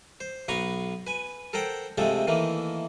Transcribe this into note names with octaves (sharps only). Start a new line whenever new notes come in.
C5
B1 B3 B4 A#5 C6 C#6
B4 G#5
A4 A#4 C5 F#5 G5
C3 F3 G#3 A3 C4 A4
D#3 E3 A3 A#3